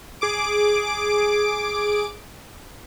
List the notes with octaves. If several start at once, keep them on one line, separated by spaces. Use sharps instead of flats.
G#4 D6 D7